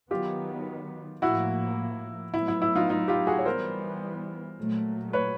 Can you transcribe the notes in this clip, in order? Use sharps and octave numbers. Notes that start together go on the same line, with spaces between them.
D#3 F#3 B3 F4 G4
A2 F3 A#3 E4 F#4
A2 F#3 B3 E4
E4
E4
D#4 F4
D#4 F4
F4 G4
F#4 G#4
C#5
E3 G3 B3 A#4 C5
A#2 F#3 A3
B4 C#5